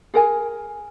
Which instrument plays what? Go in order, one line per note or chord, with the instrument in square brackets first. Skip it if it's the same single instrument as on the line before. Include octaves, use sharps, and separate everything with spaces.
[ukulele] G#4 A#4 G#5